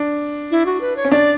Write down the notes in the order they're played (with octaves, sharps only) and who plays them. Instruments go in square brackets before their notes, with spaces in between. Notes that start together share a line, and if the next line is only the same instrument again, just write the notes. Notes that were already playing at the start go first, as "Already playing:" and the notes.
Already playing: [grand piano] D4
[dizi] E4
F#4
B4
C#5
[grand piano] C#4
[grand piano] D4 [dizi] D5